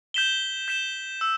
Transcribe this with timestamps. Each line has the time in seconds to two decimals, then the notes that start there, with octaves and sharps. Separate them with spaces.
0.14 G6 B6 E7 G7
0.68 G6 B6 E7 G7
1.21 E6